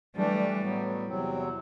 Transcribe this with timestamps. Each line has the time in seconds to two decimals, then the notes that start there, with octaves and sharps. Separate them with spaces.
0.16 E3 G3 A3 D4
0.60 A2 F#3 B3
1.06 E2 C3 F#3 C4